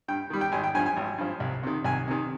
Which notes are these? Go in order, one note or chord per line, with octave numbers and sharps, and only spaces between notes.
G2 G5
D#3 G3
G5
G#1 G#5
G5
G2 F3 G#5
G#5
G#1
G2 F3
C2
C3 D#3
C2 G#5
C3 D#3